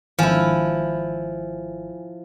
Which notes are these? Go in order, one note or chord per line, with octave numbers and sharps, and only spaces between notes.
G#1 F3 E4 G#5